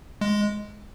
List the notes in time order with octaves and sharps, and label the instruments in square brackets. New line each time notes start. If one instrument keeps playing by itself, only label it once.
[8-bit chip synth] G#3